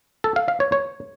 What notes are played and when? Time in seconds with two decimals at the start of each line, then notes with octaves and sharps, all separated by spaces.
0.24 A4
0.36 F5
0.48 F5
0.60 C#5
0.72 C#5